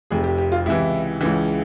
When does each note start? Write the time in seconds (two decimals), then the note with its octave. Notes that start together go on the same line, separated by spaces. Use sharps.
0.11 F1 F2 C3 G#4
0.24 G4
0.38 G4
0.52 F4
0.66 C#2 C3 E3 E4
1.21 C#2 C#3 E3